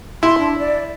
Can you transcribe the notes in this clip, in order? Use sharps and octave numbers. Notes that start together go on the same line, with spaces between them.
E4 C6
D4
D5